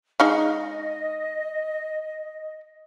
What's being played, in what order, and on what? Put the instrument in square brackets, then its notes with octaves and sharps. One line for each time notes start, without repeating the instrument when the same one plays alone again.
[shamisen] G#3 D#4 F5 [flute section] D#5